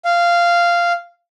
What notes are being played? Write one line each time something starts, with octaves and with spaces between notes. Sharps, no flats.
F5